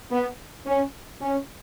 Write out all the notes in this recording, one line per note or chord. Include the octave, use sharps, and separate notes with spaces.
B3
C#4
C#4